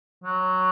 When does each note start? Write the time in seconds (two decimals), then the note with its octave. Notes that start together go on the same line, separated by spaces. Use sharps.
0.24 F#3